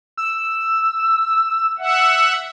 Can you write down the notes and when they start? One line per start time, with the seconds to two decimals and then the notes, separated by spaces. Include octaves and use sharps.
0.17 E6
1.78 E5 F#5